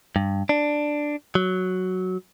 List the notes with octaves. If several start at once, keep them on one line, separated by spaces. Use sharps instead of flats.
G2
D4
F#3